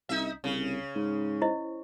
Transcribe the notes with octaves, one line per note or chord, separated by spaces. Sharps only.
C2 D#4 E5
C2 C#3
G#2
E4 C5 D#5